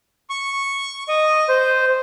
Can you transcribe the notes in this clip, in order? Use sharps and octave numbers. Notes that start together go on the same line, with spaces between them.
C#6
D#5
C5